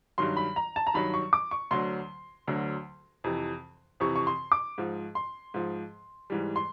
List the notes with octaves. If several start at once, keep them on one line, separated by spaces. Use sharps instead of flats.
G2 D#3 F#3 C6
B5
A#5
A5
A#5
G2 D#3 F#3 B5
C#6
D6
C#6
D2 D3 F#3 C6
D2 D3 F#3
F2 C3 E3
F2 C3 E3 C#6
C#6
C6
D6
G#2 F3
C6
G#2 F3
G#2 E3 G3
C6